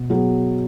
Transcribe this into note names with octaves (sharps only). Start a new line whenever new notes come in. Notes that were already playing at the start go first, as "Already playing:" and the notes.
Already playing: B2
F#3 B3 G#4